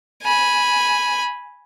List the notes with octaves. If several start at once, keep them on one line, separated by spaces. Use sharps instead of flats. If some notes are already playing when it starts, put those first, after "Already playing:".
G#5 B5